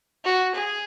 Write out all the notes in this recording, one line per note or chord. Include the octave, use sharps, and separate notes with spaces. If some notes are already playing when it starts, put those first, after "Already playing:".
F#4
G#4